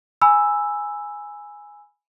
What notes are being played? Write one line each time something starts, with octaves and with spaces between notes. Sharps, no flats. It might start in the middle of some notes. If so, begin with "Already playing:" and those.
G#5 B5 E6